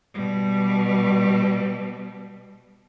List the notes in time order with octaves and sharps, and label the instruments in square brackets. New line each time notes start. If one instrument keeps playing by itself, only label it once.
[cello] B2 G3